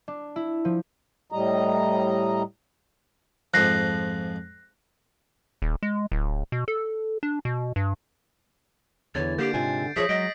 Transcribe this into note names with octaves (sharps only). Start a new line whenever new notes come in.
D4
E4
F3
A2 G3 D#5 A#5
F2 G#2 F3 F#6 A#6 C7
D#1
G#3
D1
B2
A4
D4
B2
G2
E2 D3 E3 C#5 A6
D3 A#3 G4 G6 C7 D7
G#2 C3 F4 G#5
F3 G#4 C#5 D5 E5 D#6 A#6 B6
F#3 G#3 D#5 D7